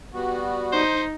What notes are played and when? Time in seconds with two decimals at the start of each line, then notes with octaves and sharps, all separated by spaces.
0.14 G3 B3 F#4
0.72 D#4 C5